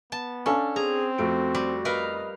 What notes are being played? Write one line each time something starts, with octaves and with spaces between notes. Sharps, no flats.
B3 A5
C#4 D4 A4 F5
C4 G#4 A#5
F2 A3 F#4 D7
G3
A#4 B4 D#5 F5